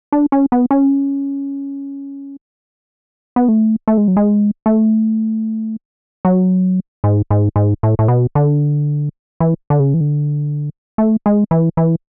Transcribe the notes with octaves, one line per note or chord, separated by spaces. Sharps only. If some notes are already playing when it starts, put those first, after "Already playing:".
D4
C#4
B3
C#4
B3
A3
A3
G#3
F#3
G#3
A3
F#3
G#2
G#2
G#2
A2
A2
B2
D3
E3
D3
C#3
E3
D3
A3
G#3
E3
E3